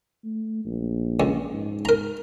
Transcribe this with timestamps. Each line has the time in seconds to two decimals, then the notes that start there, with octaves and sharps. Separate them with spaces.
0.24 A3
0.65 A#1
1.20 C#2
1.53 G#2
1.85 A#4 A#5